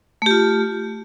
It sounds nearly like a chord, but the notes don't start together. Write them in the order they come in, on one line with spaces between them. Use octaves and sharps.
A3 G4 F4